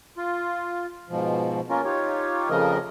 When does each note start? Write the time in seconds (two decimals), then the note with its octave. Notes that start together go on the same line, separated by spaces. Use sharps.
0.17 F4
1.10 G#2 B2 F3
1.70 A#3 C#4 F4 A#4
1.84 D#4 F4 G4 C#5
2.49 F2 C#3 F3 A3 A#4 D#5